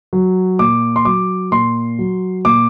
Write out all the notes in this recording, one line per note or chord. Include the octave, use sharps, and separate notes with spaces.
F#3
A#2 D6
C6
F#3 D6
A#2 C6
F#3
A#2 D6